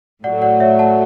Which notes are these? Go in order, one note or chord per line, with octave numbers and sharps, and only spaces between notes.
A2 F#3 A3 D5 F#5
D5 F#5
C#5 E5
F#5 A5